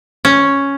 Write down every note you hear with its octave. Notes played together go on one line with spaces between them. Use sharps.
C#4